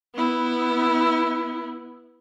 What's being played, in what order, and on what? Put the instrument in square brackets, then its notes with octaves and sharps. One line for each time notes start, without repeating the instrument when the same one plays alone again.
[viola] B3 E4